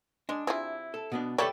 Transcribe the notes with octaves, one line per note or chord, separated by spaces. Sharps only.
G#3 D4
C3 E4 F4 G#4
A4
B2 B3 D4
G3 A3 A4 B4 C#5 D5 G5